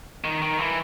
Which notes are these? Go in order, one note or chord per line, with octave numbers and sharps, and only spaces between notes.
D#3
D#3
E3